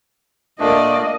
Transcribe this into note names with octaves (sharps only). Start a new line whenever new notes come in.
A#2 A3 A#3 D4 D5 D#5